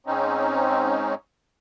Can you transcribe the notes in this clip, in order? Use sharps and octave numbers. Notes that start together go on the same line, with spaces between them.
G#2 C4 C#4 D#4